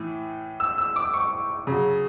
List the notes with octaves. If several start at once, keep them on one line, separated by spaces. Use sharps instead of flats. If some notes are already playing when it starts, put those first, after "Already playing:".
Already playing: A2 E3
E6
E6
D6
C#6
C#3 F#3